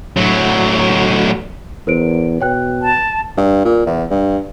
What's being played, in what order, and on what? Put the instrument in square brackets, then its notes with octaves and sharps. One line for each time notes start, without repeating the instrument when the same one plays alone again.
[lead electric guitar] A2 F#3
[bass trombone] E2 [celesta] A#4 C5 D7
[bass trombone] B2 [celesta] C#5 G5 F#6
[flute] A5
[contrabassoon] G2
A#2
E2
G2